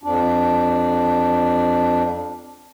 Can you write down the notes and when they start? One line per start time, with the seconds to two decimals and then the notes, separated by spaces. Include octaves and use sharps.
0.04 F2 D4